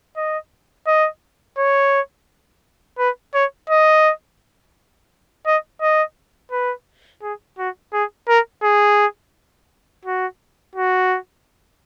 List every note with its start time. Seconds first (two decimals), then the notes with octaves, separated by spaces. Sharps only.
0.17 D#5
0.87 D#5
1.58 C#5
2.99 B4
3.34 C#5
3.70 D#5
5.47 D#5
5.82 D#5
6.52 B4
7.23 G#4
7.58 F#4
7.93 G#4
8.29 A#4
8.64 G#4
10.05 F#4
10.76 F#4